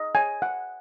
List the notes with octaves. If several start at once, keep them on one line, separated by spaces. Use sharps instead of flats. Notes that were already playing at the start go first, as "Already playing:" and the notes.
Already playing: D#5
G#5
F#5